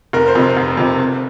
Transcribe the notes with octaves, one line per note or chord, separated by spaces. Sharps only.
F1 A#4
C5
F2 C3
F1
F2 C3
F1